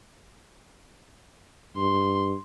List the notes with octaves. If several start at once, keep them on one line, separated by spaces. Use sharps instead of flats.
G2 C6